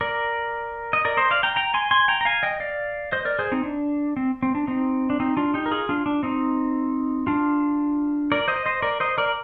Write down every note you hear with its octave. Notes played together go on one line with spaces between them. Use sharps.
A#4 D5
D#5
A#4 D5
C5 D#5
D5 F5
G5 A#5
G5 A#5
G#5 C6
G#5 C6
G5 A#5
A#5
F5 G#5
D#5 G5
D5 F5
C5 D#5
A#4 D5
G#4 C5
C4 D#4
D4
C4
C4
D4
C4 D#4
D4
C4 D#4
D4 F4
D#4 G4
A#4
F4 G#4
D4 F4
D4
C4 D#4
D4 F4
A#4 D5
C5 D#5
C5 D#5
A#4 D5
C5 D#5
A#4 D5